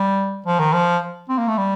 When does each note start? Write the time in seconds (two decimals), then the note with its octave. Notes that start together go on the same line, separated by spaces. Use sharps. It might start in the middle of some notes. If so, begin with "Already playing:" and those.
Already playing: G3
0.46 F3
0.59 D#3
0.73 F3
1.29 C4
1.38 A#3
1.48 A3
1.58 G3